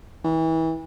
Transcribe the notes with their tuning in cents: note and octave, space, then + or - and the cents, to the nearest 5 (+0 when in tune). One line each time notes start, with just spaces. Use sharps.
E3 -30